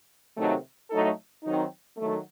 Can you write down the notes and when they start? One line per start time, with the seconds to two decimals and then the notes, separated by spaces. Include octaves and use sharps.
0.35 C3 D#3 F#3 A3 D#4
0.90 A2 F#3 A3 D#4 A4
1.43 D#3 F#3 C4 D#4
1.97 D#3 F#3 A3